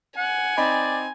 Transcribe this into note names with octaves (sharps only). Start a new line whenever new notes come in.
F#5 G#5
C4 D#4 D5 B5